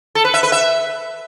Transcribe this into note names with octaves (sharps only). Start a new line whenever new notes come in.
A4
B4
E5
B4
E5